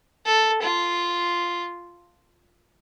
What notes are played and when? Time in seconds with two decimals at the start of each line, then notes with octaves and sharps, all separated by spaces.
0.26 A4
0.62 F4